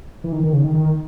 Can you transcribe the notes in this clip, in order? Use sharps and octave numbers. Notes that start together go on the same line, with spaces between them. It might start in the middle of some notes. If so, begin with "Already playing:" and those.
E3
D#3
D#3
C#3
D#3
D#3